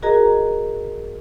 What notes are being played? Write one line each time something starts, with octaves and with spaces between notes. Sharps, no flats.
F#4 G#4 A#4 D#5 A#5